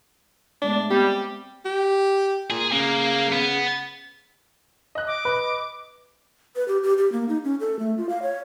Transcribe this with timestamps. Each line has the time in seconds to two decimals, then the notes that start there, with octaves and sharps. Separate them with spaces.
0.62 A2 G#3 B3 D4
0.90 G3 B3 C4 G4
1.65 G4
2.50 A#2 G#4
2.72 C#3 A#3
3.32 B3
4.95 D#5 F#6
5.07 D6
5.25 B4
6.56 B4
6.68 G4
6.83 G4
6.98 G4
7.12 A#3
7.29 D#4
7.44 C#4
7.60 A4
7.79 A3
7.98 F4
8.09 F5
8.22 C#5